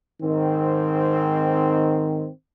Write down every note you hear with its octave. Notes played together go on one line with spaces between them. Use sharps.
G#2 D#3 C4